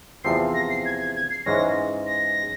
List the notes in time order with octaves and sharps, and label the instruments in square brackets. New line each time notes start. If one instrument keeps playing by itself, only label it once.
[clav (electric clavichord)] E2 C3 F3 C4 [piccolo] C7
[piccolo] A#6
C7
G#6
G#6
G#6
C7
[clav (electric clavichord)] G#2 E3 G#3 C#4 [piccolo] A#6
[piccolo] A#6